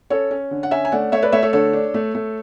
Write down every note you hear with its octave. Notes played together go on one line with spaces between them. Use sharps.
C#4 A4 C#5
C#4
D3
F#5
C#4 E5 G#5
G#5
A3 D5 F#5
A3 C#5 E5
B4 D5
A3 C#5 E5
A4 C#5
D3 A4 C#5
D4
A3
A3